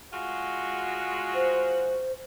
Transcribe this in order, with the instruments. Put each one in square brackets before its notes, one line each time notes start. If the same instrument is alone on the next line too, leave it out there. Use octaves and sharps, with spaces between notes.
[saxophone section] G#3 F4 F#4
[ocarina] C5